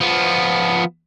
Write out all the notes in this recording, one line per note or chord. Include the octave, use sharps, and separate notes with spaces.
F3 B3